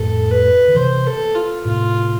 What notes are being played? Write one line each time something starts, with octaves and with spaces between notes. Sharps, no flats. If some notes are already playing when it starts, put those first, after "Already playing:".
Already playing: F2 A2 A4
B4
D3
C3 E3 C5
A4
F4
A2 C3 F4